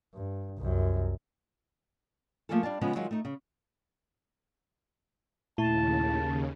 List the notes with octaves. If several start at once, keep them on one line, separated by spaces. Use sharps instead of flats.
G2
C2 F#2
F3 A3 A#3 F4 G#4 A4
G3 D4 F5 A5
C#3 F3 G#3 B3 C#4
D#3 F#3 G#3 F4
A3 D#4
C#3
D#2 A#2 C#3 A3 E4 A5